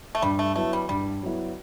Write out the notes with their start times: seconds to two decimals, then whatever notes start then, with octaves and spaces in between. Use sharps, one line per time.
0.15 A3
0.22 G2 G3
0.39 A3
0.55 F#3 A3 B3 E4
0.73 G3
0.89 G2 G3
1.23 F#3 B3 E4